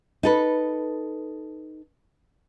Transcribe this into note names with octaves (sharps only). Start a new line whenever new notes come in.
D#4 A4 B4